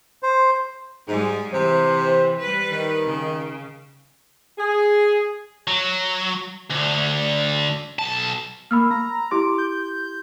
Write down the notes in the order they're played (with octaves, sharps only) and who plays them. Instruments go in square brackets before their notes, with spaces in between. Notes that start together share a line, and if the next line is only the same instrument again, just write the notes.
[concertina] C5
[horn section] G#2 [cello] G3 G#3
[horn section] C3 C5 [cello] E3
[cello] G3 B4
[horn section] D#3
[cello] C#3
[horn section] G#4
[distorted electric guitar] F#3
D2 D3
B1 A5
[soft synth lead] A#3 [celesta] B5 E6 F6
[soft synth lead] A#5
[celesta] E4 G4 C6 [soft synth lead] D6
[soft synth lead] G6